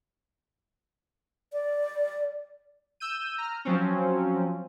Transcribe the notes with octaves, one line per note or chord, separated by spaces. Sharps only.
D5
E6 G6 D#7
A#5 F6
F3 F#3 C4 C#4